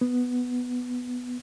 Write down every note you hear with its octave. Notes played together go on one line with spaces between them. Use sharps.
B3